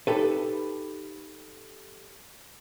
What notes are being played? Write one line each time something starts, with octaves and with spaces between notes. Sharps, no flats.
D#4 G4 A4 B4